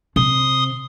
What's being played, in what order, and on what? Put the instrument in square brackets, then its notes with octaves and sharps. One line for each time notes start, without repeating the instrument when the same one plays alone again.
[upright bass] C3 [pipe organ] C6 D#6